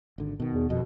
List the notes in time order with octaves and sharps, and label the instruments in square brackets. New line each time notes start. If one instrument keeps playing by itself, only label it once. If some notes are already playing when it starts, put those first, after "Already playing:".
[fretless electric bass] G#1 D3
B2 D#3
[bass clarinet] E2
[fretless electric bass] D#1 F2 [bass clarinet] B2